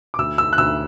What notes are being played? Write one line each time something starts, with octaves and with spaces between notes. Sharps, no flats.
D6
D2 E6
E6
F#6
D2 E6